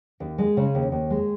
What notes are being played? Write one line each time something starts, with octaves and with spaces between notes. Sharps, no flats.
D#2
G#3
C#3
D#2
D#2
G#3